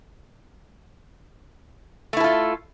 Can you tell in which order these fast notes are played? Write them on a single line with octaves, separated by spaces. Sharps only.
A3 E4 A4 F4